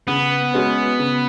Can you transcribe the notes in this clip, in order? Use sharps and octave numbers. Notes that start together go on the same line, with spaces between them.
C#3 B3
G#3 C#4 F#4 B4
C#3